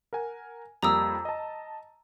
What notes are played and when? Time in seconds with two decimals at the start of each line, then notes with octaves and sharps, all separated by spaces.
0.13 A#4 F#5 G#5
0.83 F2 G3 A#3 A#5 D#6 E6
1.25 D#5 A5